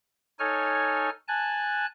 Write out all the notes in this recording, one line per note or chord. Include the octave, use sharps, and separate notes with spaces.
D#4 A4 C#5 G#5 F6
G#5 A5 F#6